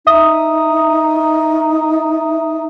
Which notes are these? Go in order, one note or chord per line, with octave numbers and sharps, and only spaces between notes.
D#4 E5 D#6